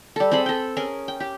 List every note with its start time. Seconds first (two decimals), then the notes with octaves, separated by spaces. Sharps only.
0.16 G3 A4
0.31 C4 G#4 A4 B5
0.46 A4 G5
0.77 C#4 G#4 A#4
1.08 G5
1.20 G4